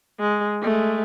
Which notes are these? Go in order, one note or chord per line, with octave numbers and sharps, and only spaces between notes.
G#3
G#3 A3